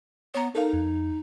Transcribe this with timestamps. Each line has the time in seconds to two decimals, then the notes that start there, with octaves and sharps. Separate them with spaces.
0.35 B3 C#5 A#5
0.55 D#4 A4 A#4 F5
0.73 F2